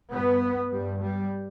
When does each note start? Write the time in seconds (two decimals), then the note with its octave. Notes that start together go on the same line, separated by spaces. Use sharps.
0.11 G2 B3
0.71 G2 G3
1.01 G3